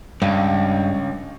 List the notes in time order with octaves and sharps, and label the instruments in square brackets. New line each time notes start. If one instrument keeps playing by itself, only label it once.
[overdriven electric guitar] C#2 [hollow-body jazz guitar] G2